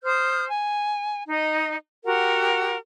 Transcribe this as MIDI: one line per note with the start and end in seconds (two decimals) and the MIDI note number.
0.04 0.47 72
0.04 0.47 87
0.04 0.47 89
0.04 0.47 91
0.49 1.23 80
1.29 1.76 63
1.29 1.76 75
2.05 2.77 66
2.05 2.77 67
2.05 2.77 70
2.05 2.77 78